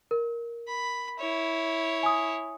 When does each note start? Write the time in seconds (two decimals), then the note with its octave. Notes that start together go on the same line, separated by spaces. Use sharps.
0.11 A#4
0.68 B5
1.20 E4 C#5
2.03 G#5 D#6